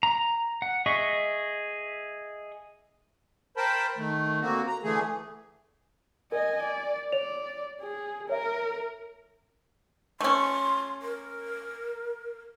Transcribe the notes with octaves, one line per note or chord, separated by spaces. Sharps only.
A#5
F#5
G#4 D#5 E5 C#6
A#4 C5 G5 A5 B5
D#3 A3
D3 A#3 C4 F#4
A#5
D3 E3 A3 G#4
A#4 D#5 G#5
D5
C#5 D5 F7
G#4
A#4 C#5 E5
A3 C#4 C6
A#4